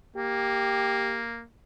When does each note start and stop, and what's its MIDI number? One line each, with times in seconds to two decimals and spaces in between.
0.16 1.45 58
0.16 1.23 67